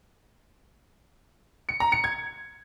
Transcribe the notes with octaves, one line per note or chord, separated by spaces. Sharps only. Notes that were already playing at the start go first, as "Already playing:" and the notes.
C#7
A#5
C#7
G#6